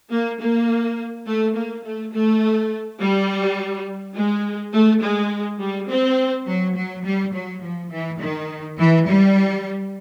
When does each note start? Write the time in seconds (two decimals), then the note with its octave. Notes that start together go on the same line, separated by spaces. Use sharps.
0.10 A#3
0.40 A#3
1.26 A3
1.56 A#3
1.84 A3
2.13 A3
2.99 G3
4.15 G#3
4.73 A3
5.02 G#3
5.59 G3
5.89 C4
6.46 F#3
6.76 F#3
7.04 G3
7.33 F#3
7.62 F3
7.90 E3
8.20 D#3
8.78 E3
9.06 G3